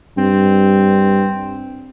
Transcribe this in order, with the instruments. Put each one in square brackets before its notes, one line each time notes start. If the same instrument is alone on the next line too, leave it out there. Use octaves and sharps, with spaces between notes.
[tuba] G2 [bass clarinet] C4